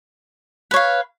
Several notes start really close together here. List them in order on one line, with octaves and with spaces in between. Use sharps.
B4 C#5 F5